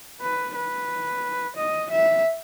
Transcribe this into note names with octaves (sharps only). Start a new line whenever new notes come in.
B4
B4
D#5
E5